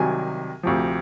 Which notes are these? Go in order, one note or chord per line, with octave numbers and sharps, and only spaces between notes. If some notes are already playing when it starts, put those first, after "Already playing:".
Already playing: C2 C3 D#3 F#3 G#5
D2 C3 F3